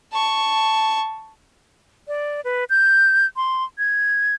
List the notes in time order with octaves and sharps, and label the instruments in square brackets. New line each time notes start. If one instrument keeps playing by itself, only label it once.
[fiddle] A5 C#6
[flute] D5
B4
G6
C6
G#6